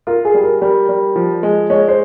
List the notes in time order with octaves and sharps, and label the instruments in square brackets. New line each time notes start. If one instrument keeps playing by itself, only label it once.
[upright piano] F4 [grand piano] A#4
[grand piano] G#4
[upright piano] G3
[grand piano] A#4
[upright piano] G3 [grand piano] A#4
[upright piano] G3
F3
G#3
[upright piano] G#3 [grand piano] C#5
[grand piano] C5